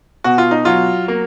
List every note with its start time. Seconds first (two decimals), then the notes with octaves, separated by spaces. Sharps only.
0.24 B2 F#4
0.38 F4
0.51 D#4
0.65 F#3 F4
1.08 A#3